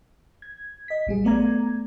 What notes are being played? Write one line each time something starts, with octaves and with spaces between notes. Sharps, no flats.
G#6
D#5 B6
A#1 G3 G#4
A3 B3 D5 A#5 G#6